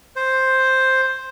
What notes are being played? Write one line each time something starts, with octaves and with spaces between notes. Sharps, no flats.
C5